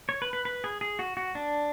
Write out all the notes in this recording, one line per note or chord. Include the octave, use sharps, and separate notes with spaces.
C#5
B4
B4
B4
G#4
G#4
F#4
F#4
D4